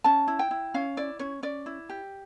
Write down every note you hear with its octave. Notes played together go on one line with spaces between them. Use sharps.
C#4 A5
E4
G5
E4
C#4 F5
E4 D5
C#4 C#5
C#4 D5
E4
G4